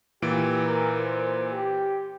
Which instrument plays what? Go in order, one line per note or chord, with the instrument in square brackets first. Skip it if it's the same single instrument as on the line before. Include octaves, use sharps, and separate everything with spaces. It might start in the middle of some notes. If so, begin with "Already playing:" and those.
[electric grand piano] A#2 E3 D7 [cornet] G4
[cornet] A#4
C5
G4